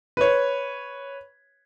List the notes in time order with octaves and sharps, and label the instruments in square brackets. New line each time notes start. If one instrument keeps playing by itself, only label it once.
[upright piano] B4 C#5